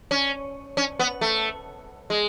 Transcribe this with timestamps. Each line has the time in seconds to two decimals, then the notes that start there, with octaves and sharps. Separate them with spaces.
0.11 C#4
0.77 C#4
0.99 B3
1.21 A3
2.10 G#3